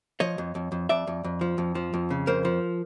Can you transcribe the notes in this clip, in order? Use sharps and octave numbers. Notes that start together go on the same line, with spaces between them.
F3 C#5 D#5
F2
F2
F2
F2 D5 E5
F2
F2
F3
F2
F3
F2
C#3
F2 A#4 C5
F3